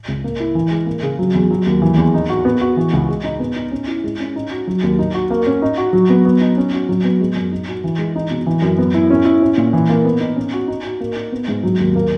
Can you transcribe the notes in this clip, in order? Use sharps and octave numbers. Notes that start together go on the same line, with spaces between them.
C#2
A#3
E4
E3
G#3
A#3
C#3
F#3
E2
F#3
D#2
E3
E2
D#4
F#4
B3
F#4
E3
C#2
G#3
D#4
B3
D#4
C#4
E4
G#3
C#4
D#4
F#4
F#3
D#2
D#4
F#4
A#3
C#4
D#4
F#4
F#3
B3
B3
D#4
C#4
F#4
F#3
B3
G#3
F#2
D#4
F#4
E3
G#3
D#4
B2
E3
F#2
B3
E4
C#4
E4
C#4
A#2
E3
A#3
B3
D#4
C#4
F#4
D#4
F#4
A#3
D#4
B3
G#2
F#3
D#2
A#3